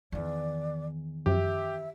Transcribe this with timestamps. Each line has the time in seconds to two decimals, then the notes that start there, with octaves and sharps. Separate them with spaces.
0.12 E2 D#3 D5
1.26 F#2 F3 G4 E5